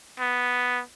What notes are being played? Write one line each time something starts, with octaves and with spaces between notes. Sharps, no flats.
B3